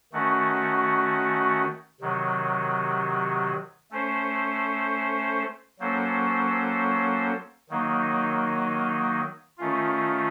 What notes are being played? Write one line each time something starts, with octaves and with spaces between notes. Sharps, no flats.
D#3 A3 C#4 F#4
C3 D#3 F#3
A3 C#4 A4 C5
F#3 A#3 C#4 A4 C5
D#3 F#3 A#3 D#4
D#3 A3 C#4 F4